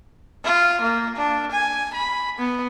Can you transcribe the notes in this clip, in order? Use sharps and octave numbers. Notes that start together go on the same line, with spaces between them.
F4
A#3
D4
G#5
B5
B3